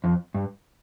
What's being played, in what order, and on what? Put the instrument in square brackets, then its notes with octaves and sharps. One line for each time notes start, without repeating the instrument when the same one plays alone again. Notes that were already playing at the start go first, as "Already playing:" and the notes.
[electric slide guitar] F2
G2